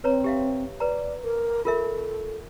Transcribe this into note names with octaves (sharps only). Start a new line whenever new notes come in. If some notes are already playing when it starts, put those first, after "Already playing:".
C4 B4 C#5 A#5
G4 E5 F5
B4 D5 A#5
A#4
F4 A4 A#4 E5